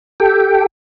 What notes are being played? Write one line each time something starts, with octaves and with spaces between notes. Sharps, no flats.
G4 A4 G5